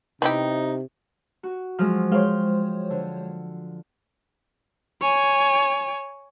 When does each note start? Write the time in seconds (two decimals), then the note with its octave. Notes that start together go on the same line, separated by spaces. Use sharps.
0.22 C3 B3 D#4 E4 G4
1.43 F#4
1.79 F3 F#3 G#3 F6
2.12 G#3 C5 C#5 F5 G5 C6
2.90 D3
5.01 C#5 G#5